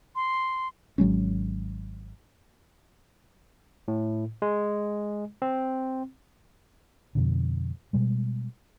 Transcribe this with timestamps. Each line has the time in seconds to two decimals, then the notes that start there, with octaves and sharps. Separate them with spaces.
0.15 C6
0.98 G#1 F#3 G#3 C#4
3.88 A2
4.42 G#3
5.42 C4
7.15 F2 B2 D3
7.93 B2 G3 G#3